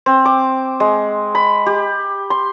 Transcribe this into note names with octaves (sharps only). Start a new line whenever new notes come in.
C4
D6
G#3
B5
G4
C6